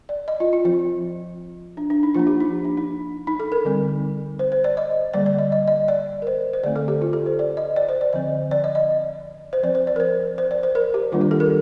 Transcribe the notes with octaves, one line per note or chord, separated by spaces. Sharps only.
D5
D#5
F4
F4
F3 C4 F4
D4
D4
D#4
F3 A#3 D4 F4
G4
D#4
D4
D#4
D#4
A4
A#4
D3 G3 C4
C5
C5
D5
D#5
D3 G3 A#3 D5
D5
D#5
D#5
D#5
D5
A#4
C5
C5
D3 A3 C4 D5
A4
G4
F4
A4
C5
D5
D#5
D5
C5
D5
D3 F3 C4 D#5
D5
D#5
D#5
C5
F3 C4 D5
C5
D5
A#4
C5
C5
D5
C5
A#4
G4
D#3 G3 A#3 D4 F4
G4
A4
A#4